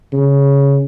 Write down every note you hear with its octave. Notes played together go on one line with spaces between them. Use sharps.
C#3